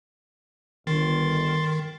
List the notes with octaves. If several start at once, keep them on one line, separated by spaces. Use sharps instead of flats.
G1 D#3 C6 A6